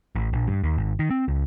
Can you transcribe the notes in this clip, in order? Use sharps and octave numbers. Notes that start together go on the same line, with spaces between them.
A1
A#1
G2
D#2
G#1
D#3
C4
C#2